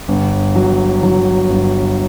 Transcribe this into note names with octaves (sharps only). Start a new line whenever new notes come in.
G1
F#3
F#3
G1